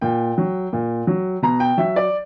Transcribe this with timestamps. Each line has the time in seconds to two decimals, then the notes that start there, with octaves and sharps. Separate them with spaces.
0.01 A#2 G5
0.38 F#3
0.73 A#2
1.07 F#3
1.42 B2 A#5
1.60 G5
1.77 F#3 E5
1.96 D5